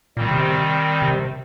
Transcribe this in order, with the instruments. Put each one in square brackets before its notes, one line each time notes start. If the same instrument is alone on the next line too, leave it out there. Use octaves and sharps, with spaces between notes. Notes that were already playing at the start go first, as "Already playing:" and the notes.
[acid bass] A#2 [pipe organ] D#3 G3 C4
[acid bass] C3
C3